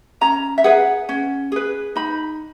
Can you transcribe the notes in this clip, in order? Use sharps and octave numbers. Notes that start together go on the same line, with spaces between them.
C#4 A#5
E5
G#4 B4 F#5
C#4
G#4 B4
D#4 B5